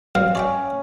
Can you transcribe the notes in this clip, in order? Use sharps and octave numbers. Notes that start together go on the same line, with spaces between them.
A1 F#3 C4 F5
C#4 D5 E5 G5